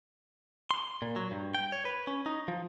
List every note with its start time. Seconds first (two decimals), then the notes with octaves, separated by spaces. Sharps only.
0.71 C6
1.02 A#2
1.16 F#3
1.31 G2
1.55 G5
1.72 C#5
1.85 B4
2.07 C#4
2.26 D#4
2.48 F3